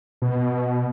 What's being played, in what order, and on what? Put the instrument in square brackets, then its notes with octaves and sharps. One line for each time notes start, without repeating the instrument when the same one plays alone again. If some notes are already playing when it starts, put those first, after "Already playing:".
[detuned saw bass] B2